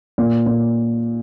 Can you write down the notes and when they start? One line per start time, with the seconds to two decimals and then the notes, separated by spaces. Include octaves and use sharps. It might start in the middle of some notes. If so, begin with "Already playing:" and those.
0.18 A#2
0.46 A#2